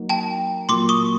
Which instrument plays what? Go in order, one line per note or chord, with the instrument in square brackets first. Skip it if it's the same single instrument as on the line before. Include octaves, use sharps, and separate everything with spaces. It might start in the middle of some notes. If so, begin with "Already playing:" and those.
Already playing: [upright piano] F#3 A#3 D#4 F#4
[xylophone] G5 A5
[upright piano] A#2 F#3 A#3 [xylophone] C6 D6
[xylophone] C#6 D#6